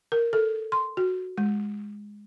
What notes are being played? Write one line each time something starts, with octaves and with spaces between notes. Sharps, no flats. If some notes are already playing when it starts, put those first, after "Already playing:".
A#4
A4
C6
F#4
G#3